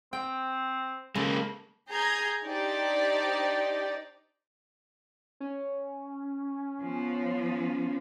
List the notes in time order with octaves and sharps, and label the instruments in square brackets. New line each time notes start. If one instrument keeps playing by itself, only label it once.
[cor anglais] C4 [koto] G5
[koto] C#3 [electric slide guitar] G#3 A#3 [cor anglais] A4
[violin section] G#4 A#5 G6 G#6
D4 D#4 G4 C5 D5
[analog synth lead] C#4
[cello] F3 B3